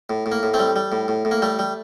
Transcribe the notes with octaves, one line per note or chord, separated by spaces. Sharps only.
A2
A2
A#3
A2
A3 C4
G3
G3
A2
A2
A2
A#3
G3 A3
G3